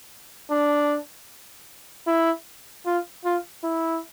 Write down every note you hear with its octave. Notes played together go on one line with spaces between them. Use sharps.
D4
E4
F4
F4
E4